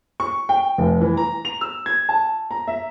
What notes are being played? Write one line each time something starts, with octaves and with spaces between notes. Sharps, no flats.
C#6
G5
F1
E3
A#5
F7
E6
G#6
A5
A#5
E5